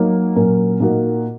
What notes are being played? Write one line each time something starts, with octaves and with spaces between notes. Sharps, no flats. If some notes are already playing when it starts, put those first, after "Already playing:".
Already playing: F#3 A#3 D#4
A#2 F#3 C#4 A#4
A#2 A#3 D#4 F#4 A#4